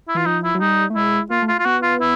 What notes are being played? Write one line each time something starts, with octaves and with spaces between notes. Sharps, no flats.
E4
E3 F4
F3 D#4
E4
F#3
G3 D#4
A3
G#3 E4
A#3 F4
A3
F4
F4
B3 F#4
F4
E4